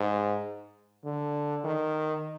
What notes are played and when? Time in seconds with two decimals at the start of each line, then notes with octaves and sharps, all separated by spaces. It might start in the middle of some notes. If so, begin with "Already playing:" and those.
Already playing: G#2
1.04 D3
1.64 D#3